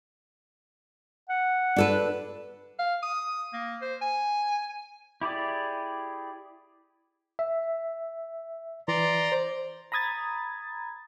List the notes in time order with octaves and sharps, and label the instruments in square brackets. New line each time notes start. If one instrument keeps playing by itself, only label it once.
[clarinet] F#5
[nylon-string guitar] D4 A4 B4
[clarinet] F5
D#6
A#3
C5
G#5
[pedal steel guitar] E4 G4 G#4 D5
[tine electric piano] E5
[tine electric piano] E3 [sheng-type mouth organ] D5 A#5 C6
[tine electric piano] C5
[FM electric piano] A#5 B5 D#6 G#6 A6